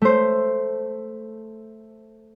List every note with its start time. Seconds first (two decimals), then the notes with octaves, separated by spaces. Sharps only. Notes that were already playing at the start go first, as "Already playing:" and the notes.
0.02 A3 C5